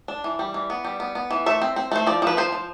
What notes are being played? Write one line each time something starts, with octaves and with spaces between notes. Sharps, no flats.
D4
E3
G3
E3
B3
G3
B3
B3
E3
A3 E5
C4
C4
A3 C5
F3 D5
F3 B4
F3 C5
F3